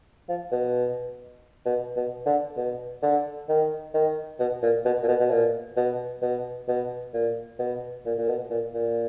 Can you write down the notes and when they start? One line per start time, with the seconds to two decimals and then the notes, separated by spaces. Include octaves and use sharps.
0.28 F3
0.51 B2
1.65 B2
1.96 B2
2.26 D3
2.57 B2
3.02 D3
3.49 D#3
3.94 D#3
4.40 B2
4.62 A#2
4.85 B2
5.03 A#2
5.08 B2
5.20 B2
5.30 A#2
5.76 B2
6.22 B2
6.68 B2
7.13 A#2
7.59 B2
8.05 A#2
8.18 A#2
8.28 B2
8.50 A#2
8.73 A#2